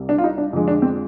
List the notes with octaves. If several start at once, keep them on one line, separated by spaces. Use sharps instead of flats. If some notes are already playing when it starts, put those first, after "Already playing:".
Already playing: C2 C3 G3
D4
F4
D#4
D4
F2 D3 G#3
D4
C4